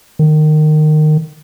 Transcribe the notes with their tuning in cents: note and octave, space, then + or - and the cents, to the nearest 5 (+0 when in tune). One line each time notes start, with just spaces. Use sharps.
D#3 -20